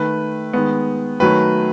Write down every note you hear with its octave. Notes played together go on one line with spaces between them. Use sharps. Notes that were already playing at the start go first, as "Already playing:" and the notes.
Already playing: D#3 A3 B4
D#3 G#3 B3
D#3 F#3 A3 B4